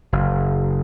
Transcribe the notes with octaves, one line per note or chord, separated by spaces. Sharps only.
F#1